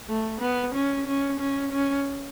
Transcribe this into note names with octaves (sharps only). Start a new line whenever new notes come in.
A3
B3
C#4
C#4
C#4
C#4